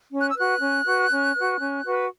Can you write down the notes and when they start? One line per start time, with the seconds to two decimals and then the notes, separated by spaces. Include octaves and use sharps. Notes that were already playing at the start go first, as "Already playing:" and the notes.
0.11 C#4
0.20 F#6
0.29 E6
0.36 F#4 B4 F#6
0.60 C#4
0.86 F#4 B4
1.11 C#4
1.36 F#4 B4
1.61 C#4
1.86 F#4 B4